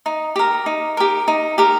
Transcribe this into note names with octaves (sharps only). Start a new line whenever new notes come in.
D#4
G4 A#4
D#4
G4 A#4
D#4
G4 A#4